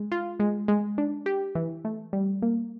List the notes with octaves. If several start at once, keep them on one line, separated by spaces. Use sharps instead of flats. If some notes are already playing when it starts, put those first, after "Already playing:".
Already playing: G#3
F4
G#3
G#3
D4
G4
E3
A3
G3
A#3